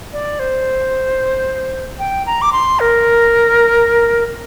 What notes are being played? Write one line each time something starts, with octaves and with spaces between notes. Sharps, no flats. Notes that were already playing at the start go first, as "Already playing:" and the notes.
D5
C5
G5
A#5
D6
C6
A#4